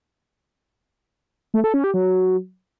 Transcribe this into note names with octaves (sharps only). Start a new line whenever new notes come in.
A3
A4
C#4
G4
F#3